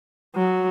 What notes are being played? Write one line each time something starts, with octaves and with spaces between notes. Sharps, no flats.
F#3